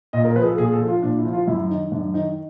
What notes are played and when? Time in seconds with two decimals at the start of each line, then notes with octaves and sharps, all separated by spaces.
0.13 A#2 D#5
0.24 A#4
0.36 F3 B4
0.42 G#4
0.47 A4
0.58 A#2 G#4
0.73 A4
0.80 F3
0.88 F4
1.02 A#2 D4
1.18 E4
1.25 F3
1.33 F4
1.48 F#2 E4
1.70 D#3 D#4
1.92 F#2 D4
2.14 D#3 D#4